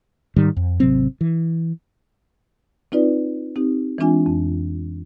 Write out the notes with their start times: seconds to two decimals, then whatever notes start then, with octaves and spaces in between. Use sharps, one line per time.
0.36 G#2 D#3 G3
0.56 F2
0.80 G#1 C3 F#3 C4
1.21 E3
2.92 C4 D#4 F4 B4 D5
3.56 C4 D#4 G4
3.98 E3 G#3 C4 D4 F4 G#5
4.26 F2